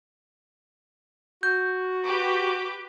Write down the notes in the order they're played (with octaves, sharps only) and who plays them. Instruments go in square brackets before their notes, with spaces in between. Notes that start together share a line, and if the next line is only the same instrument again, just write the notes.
[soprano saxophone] F#4 [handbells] G6
[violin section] G4 B4 D6